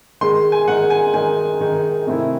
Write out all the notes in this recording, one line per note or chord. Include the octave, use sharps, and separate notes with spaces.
D#3 G#3 D#4 C6
G#5
D#3 G#3 D#4 F#5
G#5
D#3 G#3 D#4 G#5
D#3 G#3 D#4
C3 D#3 A3 C4 E4